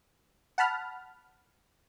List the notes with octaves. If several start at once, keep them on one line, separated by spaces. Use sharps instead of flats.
F#5 A5 B5 F6